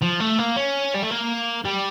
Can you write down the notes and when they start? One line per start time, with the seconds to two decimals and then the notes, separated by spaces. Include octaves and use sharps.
0.02 F3
0.20 A3
0.39 A#3
0.56 C#4
0.94 G3
1.03 A3
1.11 A#3
1.65 G3